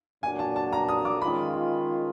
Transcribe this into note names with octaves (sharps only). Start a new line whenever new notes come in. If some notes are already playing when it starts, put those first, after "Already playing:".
A#2 F#3 A#3 D4 F#4 G#5
A5
A5
A#5
D#6
D6
D#3 G#3 C#4 F4 B5